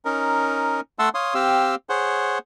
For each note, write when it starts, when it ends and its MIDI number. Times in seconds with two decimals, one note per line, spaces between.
0.05 0.80 61
0.05 0.80 63
0.05 0.80 70
0.99 1.09 57
0.99 1.09 76
0.99 1.09 78
0.99 1.09 81
0.99 1.09 84
0.99 1.09 88
1.14 1.34 73
1.14 1.34 77
1.14 1.34 84
1.14 1.34 87
1.34 1.75 60
1.34 1.75 67
1.34 1.75 77
1.34 1.75 88
1.89 2.38 68
1.89 2.38 72
1.89 2.38 73
1.89 2.38 78